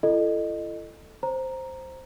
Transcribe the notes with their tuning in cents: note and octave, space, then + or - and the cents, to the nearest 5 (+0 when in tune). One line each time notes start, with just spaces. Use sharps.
E4 +45 A4 +0 D#5 -20
C5 +0 A#5 +0